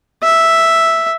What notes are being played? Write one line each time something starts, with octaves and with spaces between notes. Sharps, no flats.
E5